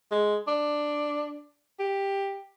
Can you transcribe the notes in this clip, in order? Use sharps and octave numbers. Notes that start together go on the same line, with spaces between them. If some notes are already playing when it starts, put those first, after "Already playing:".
G#3
D4
G4